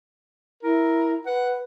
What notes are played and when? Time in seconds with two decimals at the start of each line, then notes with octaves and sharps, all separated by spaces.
0.63 E4 A#4
1.26 B4 F#5